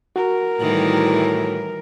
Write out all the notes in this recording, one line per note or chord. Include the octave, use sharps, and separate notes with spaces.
F#4 A#4
A2 D#3 E3 G3